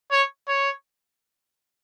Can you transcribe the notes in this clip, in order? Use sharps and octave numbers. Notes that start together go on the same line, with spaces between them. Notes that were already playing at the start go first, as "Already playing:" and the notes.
C#5
C#5